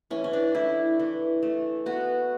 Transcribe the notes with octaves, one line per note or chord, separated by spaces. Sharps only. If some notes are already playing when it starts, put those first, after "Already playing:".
E3 C#4
C#4
D4
A3 E4
E3
A3
B3 F#4